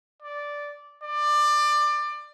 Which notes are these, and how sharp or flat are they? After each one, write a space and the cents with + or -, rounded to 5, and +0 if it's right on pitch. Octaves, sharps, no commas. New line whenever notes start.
D5 -10
D5 +20